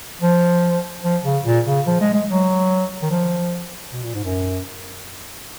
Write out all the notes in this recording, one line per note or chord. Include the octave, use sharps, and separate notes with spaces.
F3
F3
C#3
A#2
C#3
F3
G#3
G#3
F#3
D#3
F3
B2
A#2
G#2
F#2